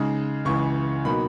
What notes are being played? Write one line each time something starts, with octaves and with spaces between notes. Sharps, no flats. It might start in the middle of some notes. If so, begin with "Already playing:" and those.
Already playing: C#3 G#3 D#4
C#2 C#3 E3 C#6
B2 F#3 A#3 D#4 B5